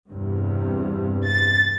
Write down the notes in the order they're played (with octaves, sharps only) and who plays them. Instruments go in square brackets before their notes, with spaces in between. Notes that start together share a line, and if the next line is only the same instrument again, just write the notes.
[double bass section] E2 G2 C3
[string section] A6